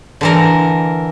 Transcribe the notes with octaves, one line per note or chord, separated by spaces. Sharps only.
D3 E3 A#4